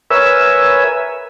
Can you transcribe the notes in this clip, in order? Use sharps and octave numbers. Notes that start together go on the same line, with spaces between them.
A#4 B4 C#5 E5 G#5 E6